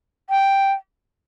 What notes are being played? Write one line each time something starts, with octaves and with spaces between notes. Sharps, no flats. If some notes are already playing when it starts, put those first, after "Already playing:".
G5